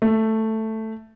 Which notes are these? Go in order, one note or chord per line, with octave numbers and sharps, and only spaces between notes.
A3